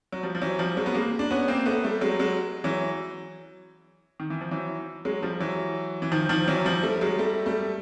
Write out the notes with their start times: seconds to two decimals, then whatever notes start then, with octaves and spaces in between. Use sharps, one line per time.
0.12 F#3
0.23 F3 G3
0.35 F3
0.41 E3 F#3
0.59 F3 G3
0.77 F#3 G#3
0.86 B3
0.95 G#3 A#3
1.19 D4
1.31 B3 C#4
1.48 A#3 C4
1.66 A3 B3
1.84 G3 A3
2.01 F#3 G#3
2.19 F#3 G#3
2.64 E3 F#3
4.20 D#3
4.30 E3
4.41 F3
4.51 E3 F#3
5.05 F#3 G#3
5.23 F3 G3
5.40 E3 F#3
6.02 E3
6.12 D#3 F3
6.29 D#3 F3
6.48 E3 F#3
6.65 F3 G3
6.83 G3 A3
7.01 F#3 G#3
7.19 G3 A3
7.46 G3 A3